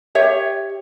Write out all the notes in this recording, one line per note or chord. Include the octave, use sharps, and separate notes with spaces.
G4 C#5 E5